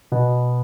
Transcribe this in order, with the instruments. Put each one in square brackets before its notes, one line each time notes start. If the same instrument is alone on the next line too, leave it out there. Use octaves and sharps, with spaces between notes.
[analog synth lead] B2